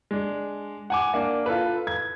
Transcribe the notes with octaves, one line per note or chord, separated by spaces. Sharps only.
G#3 D4
F#5 G#5 D6
A#3 D4
F4 A4 B4
G#6